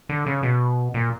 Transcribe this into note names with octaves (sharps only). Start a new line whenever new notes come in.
D3
C#3
B2
A#2